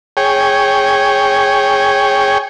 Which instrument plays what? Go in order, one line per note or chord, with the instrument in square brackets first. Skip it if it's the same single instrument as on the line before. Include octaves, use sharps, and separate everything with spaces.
[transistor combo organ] G#4 C#5 G5